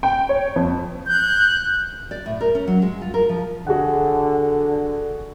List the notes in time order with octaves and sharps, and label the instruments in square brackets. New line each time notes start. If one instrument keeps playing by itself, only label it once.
[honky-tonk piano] G5
C#5
F2
[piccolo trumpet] F#6 [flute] G6
[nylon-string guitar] D5
A2
A#4
C#4
F#3
G#3
F4
A#4
F3
[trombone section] D3 [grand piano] F#4 G#4 F#5